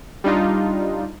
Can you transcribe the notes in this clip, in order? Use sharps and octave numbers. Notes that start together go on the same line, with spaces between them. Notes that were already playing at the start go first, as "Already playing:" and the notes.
G3 D4 D#4 F4